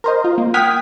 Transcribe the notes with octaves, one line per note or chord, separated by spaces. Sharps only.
A#4 C5 D#5
F4
A#3
F#5 G5 D#6 F6 G#6 B6